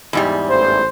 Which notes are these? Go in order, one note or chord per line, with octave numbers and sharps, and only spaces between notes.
E2 G#2 G3
A1 C5